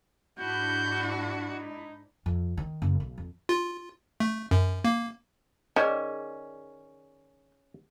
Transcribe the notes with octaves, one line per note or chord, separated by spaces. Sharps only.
G#2 D4 E4 F#4 G6
D#4
F2
D#3
F#1
B1
F2
F4
A3
F#2
A#3
D#3 C#4 G#4 B4 D5